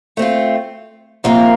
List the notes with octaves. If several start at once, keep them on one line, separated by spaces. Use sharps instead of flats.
A3 C4 F4
C3 F3 A#3 F4 A#4